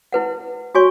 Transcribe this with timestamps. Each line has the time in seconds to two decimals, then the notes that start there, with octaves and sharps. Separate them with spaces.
0.12 E4 B4 F#5
0.75 F#4 C#5 G#5 C#6